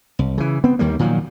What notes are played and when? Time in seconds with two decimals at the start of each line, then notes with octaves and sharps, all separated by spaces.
0.19 C2
0.38 C#3 E3
0.64 B3 C4
0.79 D#2 D#3 G3 A#3
0.99 A#2 D#3 F3 F#3